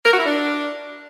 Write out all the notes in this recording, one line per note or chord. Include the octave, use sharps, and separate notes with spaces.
A#4
F#4
E4
D4